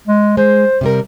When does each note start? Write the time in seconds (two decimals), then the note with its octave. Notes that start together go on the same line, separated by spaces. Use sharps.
0.07 G#3
0.37 G#3 C5
0.81 C3 G3 A#4